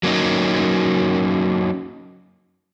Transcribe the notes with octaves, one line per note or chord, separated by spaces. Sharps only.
F#3 A#3 C#4 D#4